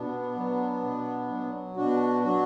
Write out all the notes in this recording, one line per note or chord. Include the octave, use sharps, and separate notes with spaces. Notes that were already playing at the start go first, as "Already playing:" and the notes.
Already playing: B2 B3 D4
F#3
B2
F#3
B2 D4 F#4
F#3 D4 F#4